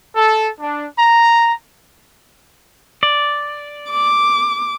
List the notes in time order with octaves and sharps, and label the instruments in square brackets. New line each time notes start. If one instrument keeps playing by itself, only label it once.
[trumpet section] A4
D4
A#5
[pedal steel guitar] D5
[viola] D6